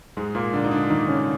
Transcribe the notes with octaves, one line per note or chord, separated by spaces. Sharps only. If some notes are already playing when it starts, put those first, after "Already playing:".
G#2 G#3
A#2 A#3
D3 D4
D#4
D3 D4
D#3 D#4
C#3 C#4